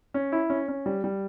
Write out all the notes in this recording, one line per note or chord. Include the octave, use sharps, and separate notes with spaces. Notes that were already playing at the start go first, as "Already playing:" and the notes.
C#4
E4
C#4
C#4
G3
G3